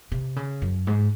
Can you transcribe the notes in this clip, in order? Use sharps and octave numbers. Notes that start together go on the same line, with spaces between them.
C3
C#3
F#2
G#2